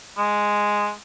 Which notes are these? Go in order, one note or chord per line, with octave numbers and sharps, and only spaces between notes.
G#3